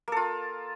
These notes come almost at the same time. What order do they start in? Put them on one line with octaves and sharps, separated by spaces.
A#3 A4 F4